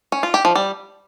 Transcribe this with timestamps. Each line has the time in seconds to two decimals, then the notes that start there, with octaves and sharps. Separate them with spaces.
0.12 C#4
0.23 F4
0.34 G4
0.45 F3
0.55 G3